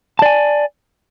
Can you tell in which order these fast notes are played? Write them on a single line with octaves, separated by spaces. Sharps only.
A5 D5 G#5